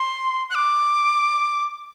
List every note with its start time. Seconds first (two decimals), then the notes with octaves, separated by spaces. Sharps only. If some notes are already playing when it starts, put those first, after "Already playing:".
Already playing: C6
0.50 F#6
0.55 D6